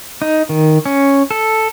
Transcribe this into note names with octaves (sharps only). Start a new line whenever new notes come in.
D#4
D#3
C#4
A4